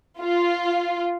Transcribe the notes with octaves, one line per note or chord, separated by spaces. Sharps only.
F4